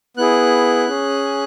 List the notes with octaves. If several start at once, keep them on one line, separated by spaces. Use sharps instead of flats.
B3 E4 G#4 F#6
C#4 G#4